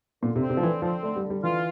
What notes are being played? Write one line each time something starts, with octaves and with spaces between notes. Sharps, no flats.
A#2 D3
C3
C4
C3
F3
D3 E3
F3 C4
D3 A3
G3
D3
G3
E3 F4